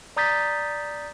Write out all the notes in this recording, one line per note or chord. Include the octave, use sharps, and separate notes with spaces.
D5 A#5 D#6 G6 A6 B6